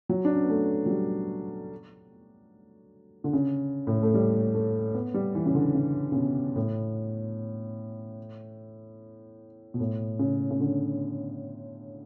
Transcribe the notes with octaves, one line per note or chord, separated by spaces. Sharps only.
F#3
D4
C#4
B3
A3
F#3
G3
D3
C#3
A2
A3
G3
A3
B3
G3
E3
C#3
D3
C#3
C#3
B2
A2
B2
A2
C#3
C#3
D3